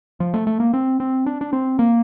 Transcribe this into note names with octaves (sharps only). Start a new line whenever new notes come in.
F3
A3
A3
A#3
C4
C4
D4
D4
C4
A#3